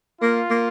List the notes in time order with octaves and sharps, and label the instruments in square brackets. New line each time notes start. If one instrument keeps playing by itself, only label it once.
[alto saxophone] A#3 [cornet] F4
[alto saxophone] A#3